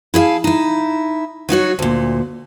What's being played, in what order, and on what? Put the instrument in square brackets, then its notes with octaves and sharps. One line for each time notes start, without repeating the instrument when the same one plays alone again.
[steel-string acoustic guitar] E4 G#4 E5 F5 A5
D#4 E4
F#3 D#4 F#4 C#5
D2 A#2